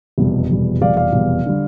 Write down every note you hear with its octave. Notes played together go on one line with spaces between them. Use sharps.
F1 E2 B2 G3
F1 E2 B2 G3
F1 E2 B2 G3 D5 F5
D5 F5
F1 E2 B2 G3
D3 G3